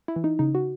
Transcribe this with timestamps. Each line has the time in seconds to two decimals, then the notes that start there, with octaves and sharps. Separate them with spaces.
0.08 E4
0.16 E3
0.24 D#4
0.39 C#3 D#4
0.55 F#4